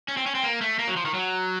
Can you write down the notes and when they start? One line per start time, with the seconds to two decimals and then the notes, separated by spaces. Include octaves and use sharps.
0.08 C#4
0.17 C4
0.26 C#4
0.35 C4
0.43 A#3
0.61 A3
0.79 A#3
0.87 F#3
0.96 F3
1.05 D#3
1.14 F#3